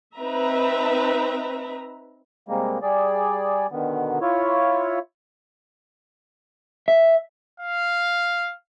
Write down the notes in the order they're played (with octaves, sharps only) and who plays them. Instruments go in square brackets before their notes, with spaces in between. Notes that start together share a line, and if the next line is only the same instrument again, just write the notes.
[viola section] C4 D#4 B4 E5 A#5
[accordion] C3 G3 G#3 A#3
G3 G#4 D5
B2 D3 D#3 B3
E4 F4 C#5
[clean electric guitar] E5
[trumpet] F5